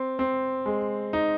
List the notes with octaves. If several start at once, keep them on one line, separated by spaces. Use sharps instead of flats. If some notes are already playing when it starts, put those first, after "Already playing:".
Already playing: C4
C4
G#3
D#4